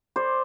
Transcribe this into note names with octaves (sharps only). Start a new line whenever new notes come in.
C5 D5